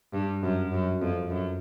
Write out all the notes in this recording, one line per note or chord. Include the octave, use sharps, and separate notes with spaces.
G2
F#2
F#2
F2
F#2